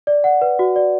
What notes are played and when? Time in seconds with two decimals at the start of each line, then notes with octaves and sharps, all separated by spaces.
0.07 D5
0.24 F#5
0.41 B4
0.59 F#4
0.76 D5